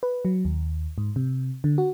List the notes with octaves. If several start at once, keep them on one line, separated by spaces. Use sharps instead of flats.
B4
F#3
D#2
G#2
C3
D3
F#4